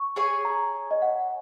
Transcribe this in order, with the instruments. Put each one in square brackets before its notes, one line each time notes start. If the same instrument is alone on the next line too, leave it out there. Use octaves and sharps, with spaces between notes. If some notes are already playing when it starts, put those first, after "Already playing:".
Already playing: [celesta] C#6
[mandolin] G#4 C#5 G#5
[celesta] A#5
D#5
F#5